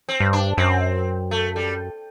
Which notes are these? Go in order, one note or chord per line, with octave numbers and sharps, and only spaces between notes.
C4
G2
D4
F#2 C4
A3
G3